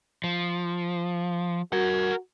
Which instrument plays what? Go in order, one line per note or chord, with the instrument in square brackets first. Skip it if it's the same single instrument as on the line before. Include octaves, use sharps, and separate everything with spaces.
[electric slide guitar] F3
[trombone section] F#4 [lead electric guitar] A#4 F#5